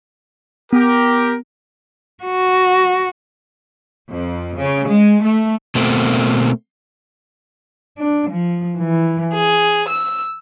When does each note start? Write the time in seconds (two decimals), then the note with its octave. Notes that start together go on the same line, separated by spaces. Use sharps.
0.73 B3 G4 A#4
2.23 F#4
4.08 F2
4.57 C#3
4.89 G#3
5.22 A3
5.75 B2 A3 A#3 C4
7.96 D4
8.29 F3
8.77 E3
9.32 G#4
9.87 E6